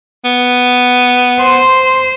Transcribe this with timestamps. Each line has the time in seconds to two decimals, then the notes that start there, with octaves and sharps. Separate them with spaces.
0.25 B3
1.40 C5 C6